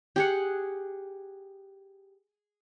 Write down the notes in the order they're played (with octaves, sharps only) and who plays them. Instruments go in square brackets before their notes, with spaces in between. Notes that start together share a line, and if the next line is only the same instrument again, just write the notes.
[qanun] G4 G#4 F#5